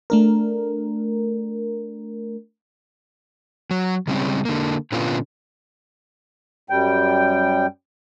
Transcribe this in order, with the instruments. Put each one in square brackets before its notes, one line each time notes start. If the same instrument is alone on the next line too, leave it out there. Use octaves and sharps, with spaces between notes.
[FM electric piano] A3 D4 A#4
[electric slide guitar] F#3
C#3 G3 G#3 C4 C#4
D3 A#3
A#2 D3 B3 C#4 F4
[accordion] F#2 G3 G5